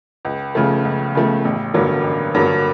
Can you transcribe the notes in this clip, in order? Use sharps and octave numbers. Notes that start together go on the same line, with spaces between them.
C#2
C#3 F3 A3
C#2
C#3 F3 A3
A1
G2 D3 F#3 A#3
A1
G2 D3 F#3 A#3